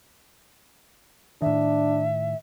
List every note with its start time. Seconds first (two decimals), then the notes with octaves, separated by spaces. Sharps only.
1.42 A2 D#3 D4 E5